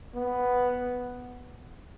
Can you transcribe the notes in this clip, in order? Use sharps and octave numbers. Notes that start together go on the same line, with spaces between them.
B3